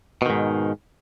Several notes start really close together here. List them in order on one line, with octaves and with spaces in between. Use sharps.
B2 D#3 G#2